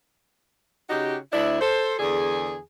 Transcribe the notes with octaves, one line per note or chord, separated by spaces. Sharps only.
C#3 D#4 F#4 G4
D2 D4 E4
A4 C5
E2 D3 G#4